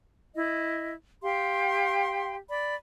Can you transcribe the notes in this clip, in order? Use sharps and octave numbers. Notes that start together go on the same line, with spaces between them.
E4 D#5
G4 F5 G5 C6
D5 B5